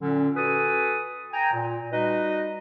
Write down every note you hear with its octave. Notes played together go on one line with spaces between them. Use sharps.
A#2 D3 F#3 C#4
F#4 A4 B4 G#5 D#6
G5 G#5 A#5
A#2
G3 D#4 F#4 B4 D#5